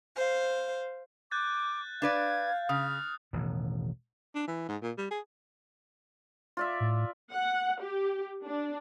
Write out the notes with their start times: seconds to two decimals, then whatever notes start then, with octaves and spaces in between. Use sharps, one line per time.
0.15 C5 F5
1.31 D6 F#6 G6 A6
2.02 D4 B4 D5 F5 G#6
2.69 C#3 D#6 F6
3.33 E1 A1 B2 D#3
4.35 D4
4.47 E3
4.68 G#2
4.82 A#2
4.98 G3
5.11 G#4
6.57 F4 D5 E5
6.80 A2
7.32 F#5
7.81 G4
8.44 D4